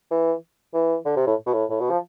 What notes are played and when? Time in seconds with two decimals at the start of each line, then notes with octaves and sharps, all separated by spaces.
0.11 E3
0.74 E3
1.05 D3
1.17 C3
1.27 A2
1.47 B2
1.53 A2
1.70 A2
1.80 B2
1.90 F3